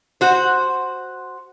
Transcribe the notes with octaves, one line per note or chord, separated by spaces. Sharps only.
F#4 C5